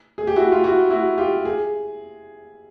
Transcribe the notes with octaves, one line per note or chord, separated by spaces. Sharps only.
G#4
G4
E4 F#4
F4
E4 F#4
E4 F#4
F4 G4
G#4